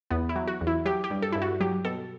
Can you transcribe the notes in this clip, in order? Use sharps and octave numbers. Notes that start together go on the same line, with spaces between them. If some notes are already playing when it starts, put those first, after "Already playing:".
E2 B3
E4
F#3
F#4
E2
E4
F#3 G4
G4
G2
A4
G2 E4
F#4
F#3 G4
B2 A4